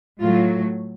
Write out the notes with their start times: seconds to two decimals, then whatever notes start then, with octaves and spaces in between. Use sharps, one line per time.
0.20 A2 F#3 A3 F4